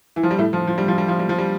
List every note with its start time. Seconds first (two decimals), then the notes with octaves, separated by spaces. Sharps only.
0.16 E3
0.23 F3
0.31 G3
0.39 A2 A3
0.53 F3
0.67 F3
0.78 G3
0.88 F3
0.98 G3
1.08 F3
1.19 G3
1.29 F3
1.38 G3